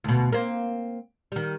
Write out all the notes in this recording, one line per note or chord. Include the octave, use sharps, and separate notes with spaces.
D2 B2
A#3 C4
D#3 G3